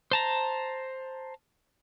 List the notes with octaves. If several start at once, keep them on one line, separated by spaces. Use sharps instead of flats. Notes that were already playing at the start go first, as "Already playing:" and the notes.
C5 A5 A#5